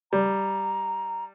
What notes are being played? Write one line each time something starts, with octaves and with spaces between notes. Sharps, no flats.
G3 A#5